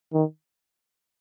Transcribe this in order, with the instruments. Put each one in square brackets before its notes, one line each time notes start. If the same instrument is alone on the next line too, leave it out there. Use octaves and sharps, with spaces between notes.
[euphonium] D#3